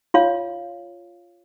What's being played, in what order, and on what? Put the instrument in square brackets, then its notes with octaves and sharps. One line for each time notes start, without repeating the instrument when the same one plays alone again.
[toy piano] F4 C#5 F5